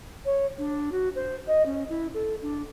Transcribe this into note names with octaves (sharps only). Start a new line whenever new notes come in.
C#5
D4
F#4
C5
D#5
C#4
E4
A4
D4